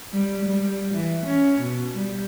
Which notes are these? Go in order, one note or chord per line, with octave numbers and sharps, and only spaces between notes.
G3
G3
E3
C#4
B2
G3